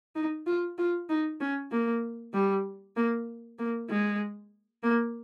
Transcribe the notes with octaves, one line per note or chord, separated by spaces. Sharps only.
D#4
F4
F4
D#4
C#4
A#3
G3
A#3
A#3
G#3
A#3